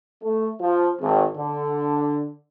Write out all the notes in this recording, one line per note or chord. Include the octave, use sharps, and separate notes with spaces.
A3
F3
G#1
D3